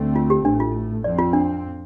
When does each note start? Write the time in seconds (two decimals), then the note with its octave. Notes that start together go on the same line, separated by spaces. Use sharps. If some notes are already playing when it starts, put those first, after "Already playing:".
Already playing: D2 D3 A3 C4
0.16 F4
0.30 G4
0.45 A1 A2 A3 D4
0.60 F4
1.04 F2 F3 C4 D5
1.19 F4
1.33 D4